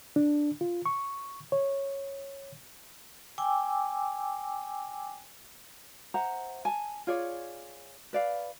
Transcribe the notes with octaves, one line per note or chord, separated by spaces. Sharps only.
D4
F4
C#6
C#5
G5 G#5 D6 E6
C5 E5 F#5 A#5
G#5 A5
F4 G#4 C#5 D5
B4 D5 F5